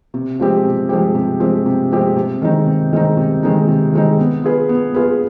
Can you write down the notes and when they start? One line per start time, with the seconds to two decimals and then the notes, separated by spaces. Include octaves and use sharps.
0.14 C3
0.39 F3 G#3 C4 G4
0.65 C3
0.89 F3 G#3 C4 G4
1.15 C3
1.40 F3 G#3 C4 G4
1.66 C3
1.91 F3 G#3 C4 G4
2.17 C3
2.42 D#3 G#3 C4 D#4
2.66 C3
2.93 D#3 G#3 C4 D#4
3.17 C3
3.43 D#3 G#3 C4 D#4
3.68 C3
3.93 D#3 G#3 C4 D#4
4.19 B3
4.44 F4 G#4 B4
4.69 B3
4.94 F4 G#4 B4